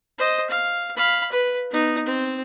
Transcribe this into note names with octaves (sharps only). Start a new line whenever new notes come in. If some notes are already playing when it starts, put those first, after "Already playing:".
C5 D#5
F5
F5 B5
B4
B3 D#4
C4